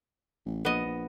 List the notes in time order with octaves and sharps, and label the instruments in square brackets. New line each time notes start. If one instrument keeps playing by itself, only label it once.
[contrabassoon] A1
[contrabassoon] A#1 [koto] B3 D#5
[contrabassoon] A#1